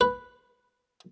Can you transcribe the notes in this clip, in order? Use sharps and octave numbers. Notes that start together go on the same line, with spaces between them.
B4